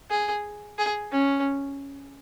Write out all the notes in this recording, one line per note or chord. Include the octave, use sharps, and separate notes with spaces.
G#4
G#4
C#4